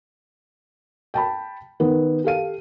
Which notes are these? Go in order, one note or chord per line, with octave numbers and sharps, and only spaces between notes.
G5 A5 B5
D#3 B3 D#4
G4 A4 F5 D#7